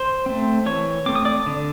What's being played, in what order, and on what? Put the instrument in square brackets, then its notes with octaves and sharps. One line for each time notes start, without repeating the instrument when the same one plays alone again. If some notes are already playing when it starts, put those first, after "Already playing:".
Already playing: [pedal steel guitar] C5 C6
A3 C4
E3 C#5 C#6
A3 C4 D6
D#6
D5 D6
D3